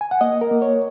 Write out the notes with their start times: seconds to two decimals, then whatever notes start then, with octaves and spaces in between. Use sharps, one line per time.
0.01 G#5
0.11 F#5
0.21 A#3 D#5
0.41 A#4
0.51 A#3
0.62 C#5